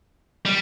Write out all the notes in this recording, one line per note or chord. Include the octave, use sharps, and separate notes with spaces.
G3